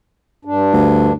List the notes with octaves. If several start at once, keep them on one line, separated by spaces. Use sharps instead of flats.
G2 D4
D2